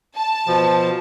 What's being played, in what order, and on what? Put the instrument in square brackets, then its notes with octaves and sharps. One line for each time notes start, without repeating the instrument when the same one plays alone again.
[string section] A5
[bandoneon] B2 F3